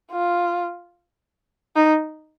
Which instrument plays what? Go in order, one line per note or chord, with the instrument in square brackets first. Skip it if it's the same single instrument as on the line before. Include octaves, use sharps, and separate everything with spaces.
[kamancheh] F4
D#4